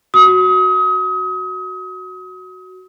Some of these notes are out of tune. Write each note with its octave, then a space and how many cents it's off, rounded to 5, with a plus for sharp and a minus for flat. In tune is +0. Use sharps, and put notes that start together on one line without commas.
F#4 +0 D#6 +35